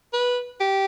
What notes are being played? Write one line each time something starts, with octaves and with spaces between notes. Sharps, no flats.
B4
G4